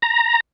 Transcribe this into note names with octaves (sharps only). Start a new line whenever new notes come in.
A#5